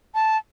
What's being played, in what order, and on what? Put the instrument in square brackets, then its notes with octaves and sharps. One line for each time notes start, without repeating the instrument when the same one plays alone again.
[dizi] A5